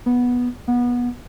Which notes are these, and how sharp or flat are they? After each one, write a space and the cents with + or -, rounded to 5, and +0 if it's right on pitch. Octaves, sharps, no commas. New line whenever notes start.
B3 -10
B3 -25